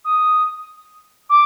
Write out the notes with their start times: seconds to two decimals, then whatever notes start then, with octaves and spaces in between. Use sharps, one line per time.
0.05 D#6
1.30 D6